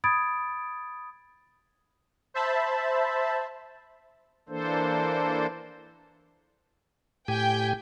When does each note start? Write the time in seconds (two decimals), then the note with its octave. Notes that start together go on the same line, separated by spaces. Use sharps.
0.04 B5 D#6 G#6 A6 D7
2.34 C5 E5 A5 B5
4.49 E3 A#3 D4 A4 C5
7.28 A2 G4 G5 G#5